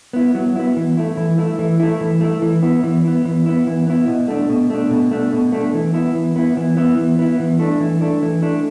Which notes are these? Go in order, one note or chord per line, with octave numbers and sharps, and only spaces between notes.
B3 E4
F#3
B3 E4
E3
A3 E4
E3
A3 E4
E3
A3 E4
E3
A3 E4
E3
B3 E4
E3
B3 E4
E3
B3 E4
E3
B3 E4
B2
A3 D4
B2
A3 D4
B2
A3 D4
B2
A3 D4
E3
B3 E4
E3
B3 E4
E3
B3 E4
E3
B3 E4
E3
A3 D4
E3
A3 D4
E3
A3 D4